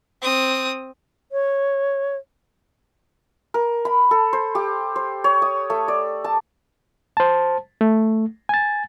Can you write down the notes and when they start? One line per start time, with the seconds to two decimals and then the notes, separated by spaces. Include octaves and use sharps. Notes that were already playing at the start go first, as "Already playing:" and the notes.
0.22 C4 D#6
1.32 C#5
3.54 A#4
3.85 B5
4.11 A4
4.33 C5
4.55 G4
4.96 C5
5.24 C#5
5.42 D#6
5.70 A3
5.88 D5
6.24 A5
7.17 C5 A5
7.81 A3
8.49 G#5 A6